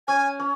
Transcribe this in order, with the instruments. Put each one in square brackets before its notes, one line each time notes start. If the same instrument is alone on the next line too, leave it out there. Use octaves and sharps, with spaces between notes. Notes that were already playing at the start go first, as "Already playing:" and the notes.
[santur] C#4 [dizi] G#5
[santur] C#4